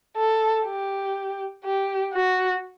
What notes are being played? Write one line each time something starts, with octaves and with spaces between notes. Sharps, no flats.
A4
G4
G4
F#4